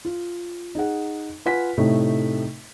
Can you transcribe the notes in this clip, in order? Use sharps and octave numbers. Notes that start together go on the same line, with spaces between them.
F4
D#4 G#4 F#5
F4 B4 F#5 G#5 B6
A2 C3 A3 D#4